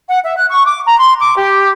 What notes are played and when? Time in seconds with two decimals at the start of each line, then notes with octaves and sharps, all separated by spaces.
0.09 F#5
0.25 E5
0.37 F#6
0.49 C#6
0.66 D6
0.86 A#5
0.99 C6
1.21 D6
1.37 G4